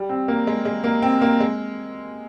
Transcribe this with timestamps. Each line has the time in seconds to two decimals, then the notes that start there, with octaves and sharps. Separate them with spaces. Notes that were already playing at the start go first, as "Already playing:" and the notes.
Already playing: G3
0.09 C4
0.28 A#3
0.47 G#3
0.65 G#3
0.84 A#3
1.02 C4
1.22 A#3
1.40 G#3